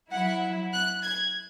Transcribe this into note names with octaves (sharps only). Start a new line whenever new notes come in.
F#3 E4 F#5
F#6
G#6